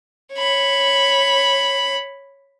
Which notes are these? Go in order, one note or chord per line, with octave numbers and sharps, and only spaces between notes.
C#5 B5